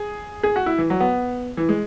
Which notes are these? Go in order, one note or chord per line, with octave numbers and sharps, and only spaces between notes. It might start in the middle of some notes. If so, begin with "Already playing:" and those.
Already playing: G#4
G#4
F#4
E4
E3
F#3
B3
E3
G#3